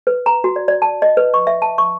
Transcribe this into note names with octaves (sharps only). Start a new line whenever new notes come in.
B4
A#5
F#4
D5
D5
A5
D#5
B4
C#6
E5
A5
C#6